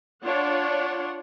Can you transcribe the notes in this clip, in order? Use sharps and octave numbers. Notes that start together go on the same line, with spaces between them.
D4 F4 C#5 F#5